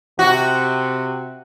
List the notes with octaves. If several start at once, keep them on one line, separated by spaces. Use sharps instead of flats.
C3 F#4